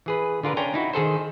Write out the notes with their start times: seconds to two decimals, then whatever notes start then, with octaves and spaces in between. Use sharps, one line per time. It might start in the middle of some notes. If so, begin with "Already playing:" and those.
0.06 E3 G#4 B4
0.43 D3 F4 A#4 B4
0.57 C#4 D4 C#5 G5 G#5 A#5
0.74 D#4 E4 F#4
0.93 D#3 G#4 A4 C5